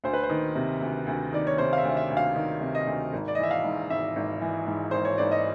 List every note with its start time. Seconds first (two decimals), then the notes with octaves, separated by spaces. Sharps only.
0.04 D2 C5
0.13 B4
0.23 C5
0.30 D#3
0.55 C3
0.81 D2
1.06 D2
1.33 D#3 D5
1.47 C#5
1.58 C3 C5
1.73 F5
1.78 E5
1.84 D2
1.97 E5
2.10 D2
2.17 F5
2.36 D#3
2.61 C3
2.75 D#5
2.87 D2
3.13 G#1
3.28 D5
3.35 D#5
3.39 E3 E5
3.51 F5
3.64 G#2
3.90 G#1 E5
4.16 G#1
4.41 E3
4.67 G#2
4.91 G#1 C5
5.05 C#5
5.18 G#1 D5
5.31 D#5